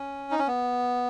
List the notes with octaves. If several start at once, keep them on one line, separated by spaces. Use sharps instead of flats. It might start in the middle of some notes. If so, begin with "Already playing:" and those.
Already playing: C#4
D#4
C#4
B3